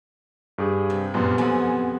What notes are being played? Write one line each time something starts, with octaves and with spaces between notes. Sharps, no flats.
G2 G4 G#4
C3
F#2 A#2 B3 C6
F2 F#5 G#5